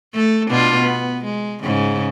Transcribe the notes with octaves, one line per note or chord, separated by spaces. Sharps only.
A3 A4
B2 D4 F4
B3
G#3
G#2 C#3